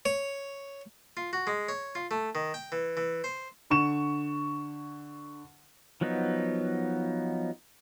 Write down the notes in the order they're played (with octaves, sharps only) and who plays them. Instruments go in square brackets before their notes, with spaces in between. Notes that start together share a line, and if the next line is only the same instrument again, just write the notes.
[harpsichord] C#5
F4
F#4
G#3
C#5
F4
A3
D#3
G5
E3
E3
C5
[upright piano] D3 C#6 E7
[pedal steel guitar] F3 F#3 B3 D#4